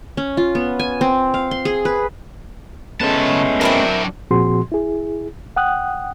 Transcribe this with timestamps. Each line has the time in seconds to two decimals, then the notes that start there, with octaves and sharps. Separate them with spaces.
0.17 C#4
0.37 F4
0.55 B3
0.79 G#5
1.01 C4
1.34 F5
1.51 C6
1.65 G#4
1.85 B4
3.01 C#3 G#3 A3 B3 C#4 A5
3.61 F#3 C4 D4 E4 A#4
4.31 A#2 F3 C4 F#4 G#4 C6
4.72 E4 G#4
5.56 F#5 G5 D#6 F#6